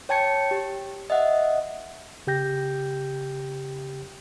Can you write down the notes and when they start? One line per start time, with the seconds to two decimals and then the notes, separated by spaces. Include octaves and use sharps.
0.09 C#5 G5 A5 G#6 C#7
0.51 G4
1.10 D#5 E5 F#5
2.27 C#3 G4 G5 G6 A#6